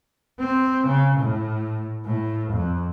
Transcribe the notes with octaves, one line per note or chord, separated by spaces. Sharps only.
C4
C#3
A2
A2
F2